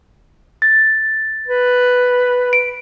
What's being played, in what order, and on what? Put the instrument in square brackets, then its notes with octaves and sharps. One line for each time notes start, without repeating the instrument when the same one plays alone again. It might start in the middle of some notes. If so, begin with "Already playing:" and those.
[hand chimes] A6
[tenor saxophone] B4
[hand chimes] D7